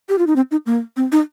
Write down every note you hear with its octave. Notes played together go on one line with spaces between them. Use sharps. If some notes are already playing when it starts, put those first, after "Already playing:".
G4
F4
D#4
C4
D#4
A#3
C4
D#4